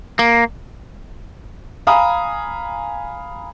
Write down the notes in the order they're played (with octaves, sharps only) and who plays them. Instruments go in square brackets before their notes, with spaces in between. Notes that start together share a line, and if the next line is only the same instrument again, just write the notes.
[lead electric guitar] A#3
[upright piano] F5 G#5 A#5 B5 D#6